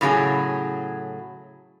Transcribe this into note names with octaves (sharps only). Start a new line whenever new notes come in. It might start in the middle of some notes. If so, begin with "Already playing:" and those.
A2 C#3 F#3 G#4